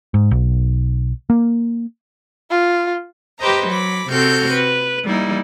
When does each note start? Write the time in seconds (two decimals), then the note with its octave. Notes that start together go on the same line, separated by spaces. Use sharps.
0.14 G#2
0.31 B1
1.30 A#3
2.51 F4
3.38 G4 B4 C5 D#5 A#5
3.68 F#3 B5 D6
4.10 C3 C4 F#4 A4 F6 G6
4.52 B4
5.05 G3 A#3 D#4 E4